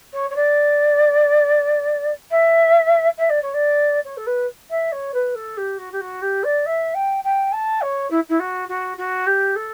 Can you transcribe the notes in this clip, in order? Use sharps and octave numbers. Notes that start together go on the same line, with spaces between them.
C#5
C#5
D5
E5
E5
D5
C#5
D5
C#5
A4
B4
E5
C#5
B4
A4
G4
F#4
G4
F#4
G4
D5
E5
G5
G5
A5
C#5
E4
E4
F#4
F#4
F#4
G4
A4